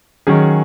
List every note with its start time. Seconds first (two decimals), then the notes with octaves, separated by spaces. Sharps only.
0.27 D#3 F#3 C#4 G#4